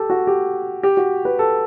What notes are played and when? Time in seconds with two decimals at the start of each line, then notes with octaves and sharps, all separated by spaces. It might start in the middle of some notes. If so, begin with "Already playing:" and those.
Already playing: G4 A4
0.10 F#4
0.27 G4
0.83 G4
0.97 F#4
1.25 B4
1.39 A4